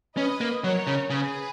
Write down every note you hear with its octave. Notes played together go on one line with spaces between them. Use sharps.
C#4 B4 D#5
A#3
F#3 A#4 C#5
C#3
C#3 G#4 B4